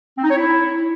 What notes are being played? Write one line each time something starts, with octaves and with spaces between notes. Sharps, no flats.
C4
D#4
C#5
E4